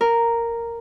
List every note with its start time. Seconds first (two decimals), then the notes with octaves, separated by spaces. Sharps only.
0.01 A#4